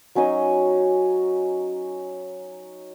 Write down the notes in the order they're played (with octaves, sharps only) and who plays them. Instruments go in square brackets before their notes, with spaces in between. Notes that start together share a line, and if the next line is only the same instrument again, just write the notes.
[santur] F#3 C#4 D#4 D#5